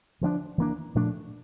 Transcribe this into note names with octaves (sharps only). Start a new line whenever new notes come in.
D3 F3 A#3 D4
E3 A#3 D4
A#2 F3 A3 D4